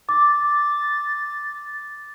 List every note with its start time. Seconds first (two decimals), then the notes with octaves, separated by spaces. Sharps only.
0.09 D6 A6